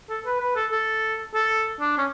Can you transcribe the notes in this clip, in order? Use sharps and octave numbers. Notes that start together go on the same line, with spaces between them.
A4
B4
B4
A4
A4
A4
D4
C#4